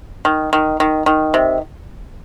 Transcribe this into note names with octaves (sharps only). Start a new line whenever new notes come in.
D#3
D#3
D#3
D#3
C3